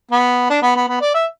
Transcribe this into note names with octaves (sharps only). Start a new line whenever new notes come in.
B3
D4
B3
B3
B3
D5
E5